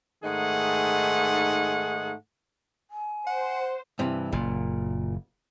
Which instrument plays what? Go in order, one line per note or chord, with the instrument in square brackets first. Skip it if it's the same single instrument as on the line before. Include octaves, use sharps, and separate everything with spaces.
[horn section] G#2 D#3 A3 D#4 G#4 F#5
[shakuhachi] G#5
[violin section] C5 [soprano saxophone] F#5
[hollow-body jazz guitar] G2 C3 E3
[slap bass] F#1 [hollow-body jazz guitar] A#2